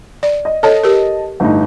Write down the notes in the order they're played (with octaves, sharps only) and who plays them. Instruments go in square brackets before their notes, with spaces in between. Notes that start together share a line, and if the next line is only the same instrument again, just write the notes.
[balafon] D5
[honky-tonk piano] D#5
[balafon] A4 C#5 [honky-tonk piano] D#5 A5
[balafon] G4 A#4
[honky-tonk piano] G1 A2 D#4